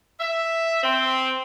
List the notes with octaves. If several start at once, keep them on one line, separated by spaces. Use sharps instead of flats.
E5
C4